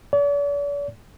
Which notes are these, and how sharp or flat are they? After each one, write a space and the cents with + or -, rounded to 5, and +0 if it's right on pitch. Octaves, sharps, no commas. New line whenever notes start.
D5 -45